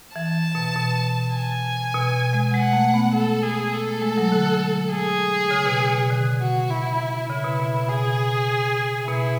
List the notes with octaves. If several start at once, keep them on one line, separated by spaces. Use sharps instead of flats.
E3 A5
B2
B2
G#5
B2
G#3
G#3 F#5
A3
B3
A4
G#4
A4
A3
G#3
F#3
D3
G#4
C#3
B2
B2
D3
F#4
E4
C#3 E4
B2
B2
B2
G#4
B2 E4